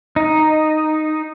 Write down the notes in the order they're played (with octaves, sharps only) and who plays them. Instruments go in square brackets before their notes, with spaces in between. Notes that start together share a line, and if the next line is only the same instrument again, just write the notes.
[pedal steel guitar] D#4